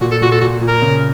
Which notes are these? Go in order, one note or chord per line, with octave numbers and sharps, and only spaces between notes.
A#2 F#4
A4
A#2 F#4
A4
A#2 F#4
A#2
A#4
C#3